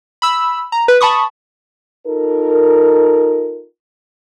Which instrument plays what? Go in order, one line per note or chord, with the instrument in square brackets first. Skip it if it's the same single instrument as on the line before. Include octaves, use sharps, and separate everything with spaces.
[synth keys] B5 E6
A#5
B4
A5 B5 C#6 D#6
[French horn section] D#4 F4 A4 A#4